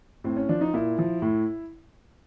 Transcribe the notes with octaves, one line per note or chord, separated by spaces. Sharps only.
A2 C4
C#4
F3 D4
D#4
A#2 E4
F3
A2